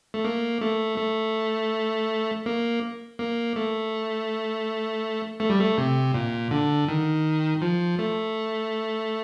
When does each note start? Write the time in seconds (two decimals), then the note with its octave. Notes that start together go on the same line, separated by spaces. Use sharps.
0.14 A3
0.25 A#3
0.61 A3
0.98 A3
2.46 A#3
3.19 A#3
3.56 A3
5.40 A3
5.50 G3
5.59 A3
5.78 C3
6.14 A#2
6.51 D3
6.88 D#3
7.62 F3
7.99 A3